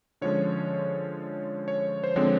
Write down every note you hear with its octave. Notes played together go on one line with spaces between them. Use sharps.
D3 F3 G#3 C#4 C#5
C#5
C5
D3 F3 G#3 C4 C#5